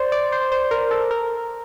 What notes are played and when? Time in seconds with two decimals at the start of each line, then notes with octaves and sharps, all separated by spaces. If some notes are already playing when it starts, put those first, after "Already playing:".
Already playing: C5 D5
0.12 D5
0.32 C5
0.52 C5
0.71 A#4
0.91 A4
1.11 A#4